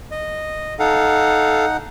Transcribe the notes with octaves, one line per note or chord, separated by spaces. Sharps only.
D#5
D#4 A4 F5 F#5